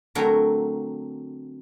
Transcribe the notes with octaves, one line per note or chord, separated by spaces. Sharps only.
D3 F#3 A3 C4 A#4 C#5